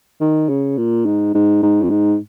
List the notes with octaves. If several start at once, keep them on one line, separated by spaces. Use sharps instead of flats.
D#3
C#3
A#2
G#2
G#2
G#2
F2
G#2